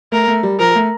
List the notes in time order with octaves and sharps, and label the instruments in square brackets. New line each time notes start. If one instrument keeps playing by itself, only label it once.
[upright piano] A3 [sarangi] A#4
[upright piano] A3
G3
[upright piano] F3 [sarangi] A#4
[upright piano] A3